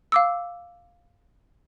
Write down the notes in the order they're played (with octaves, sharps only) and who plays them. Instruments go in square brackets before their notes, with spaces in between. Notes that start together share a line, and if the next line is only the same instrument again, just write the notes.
[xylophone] F5 D6 E6